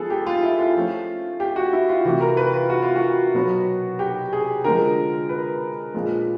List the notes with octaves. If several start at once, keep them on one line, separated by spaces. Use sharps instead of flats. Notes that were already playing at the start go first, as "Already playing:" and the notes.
Already playing: F3 G#3 B3 G#4 A4
G4
F4
E4
F4
F3 A3 C#4
G4
F#4
E4
F4
C3 E3 A3 F#4
A#4
B4
F4
F#4
F4
F#4
B2 F#3 B3
G4
G#4
D3 F3 G#3 A#4
B4
A#2 F3 G#3